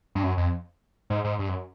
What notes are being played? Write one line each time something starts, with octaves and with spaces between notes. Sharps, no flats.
G2
F#2
F2
G#2
G#2
G2
F#2